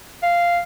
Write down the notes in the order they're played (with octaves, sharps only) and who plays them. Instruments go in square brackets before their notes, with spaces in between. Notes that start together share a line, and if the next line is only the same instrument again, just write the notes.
[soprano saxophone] F5